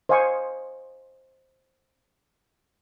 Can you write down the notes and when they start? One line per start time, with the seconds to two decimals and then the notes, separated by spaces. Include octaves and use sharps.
0.09 C5 D#5 F5 G#5 C6 C#6